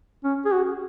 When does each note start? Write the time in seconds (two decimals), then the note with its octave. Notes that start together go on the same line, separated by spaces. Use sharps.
0.24 C#4
0.46 G#4
0.53 F#4